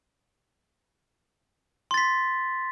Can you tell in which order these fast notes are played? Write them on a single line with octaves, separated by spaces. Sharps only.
C6 A6 B6